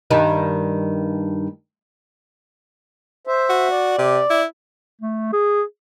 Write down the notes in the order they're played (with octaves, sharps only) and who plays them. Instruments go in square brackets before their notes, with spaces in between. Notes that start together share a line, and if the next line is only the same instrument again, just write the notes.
[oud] G2 D#3 D#4
[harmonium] C5 E5
[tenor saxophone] F#4
[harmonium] D5
[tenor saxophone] C3
E4
[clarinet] A3
G#4